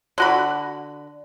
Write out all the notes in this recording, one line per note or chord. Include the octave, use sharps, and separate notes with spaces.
D3 F#4 B5